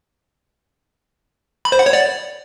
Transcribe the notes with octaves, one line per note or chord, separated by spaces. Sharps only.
B5
C5
F#5
C#5
D5